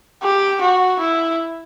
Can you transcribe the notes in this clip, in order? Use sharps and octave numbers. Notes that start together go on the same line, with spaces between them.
G4
F#4
E4